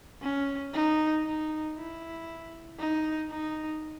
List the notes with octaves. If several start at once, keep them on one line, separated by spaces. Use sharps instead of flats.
C#4
D#4
D#4
E4
D#4
D#4